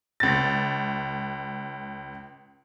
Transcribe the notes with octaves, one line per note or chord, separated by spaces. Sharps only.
C#2 A6